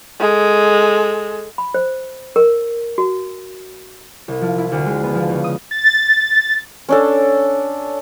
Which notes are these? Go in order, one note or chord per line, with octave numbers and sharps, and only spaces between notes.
G#3 A4
B5
C5
A#4
F#4
C2
F3
E4
D2
G#3
B3
F3
C#2
D#6
A6
C#4 D4 A4